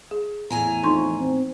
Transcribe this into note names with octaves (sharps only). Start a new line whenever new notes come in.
G#4
E2 A2 G#5 A#5
F2 D#4 C6 C#6
C4